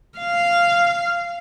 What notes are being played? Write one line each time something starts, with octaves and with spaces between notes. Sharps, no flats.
F5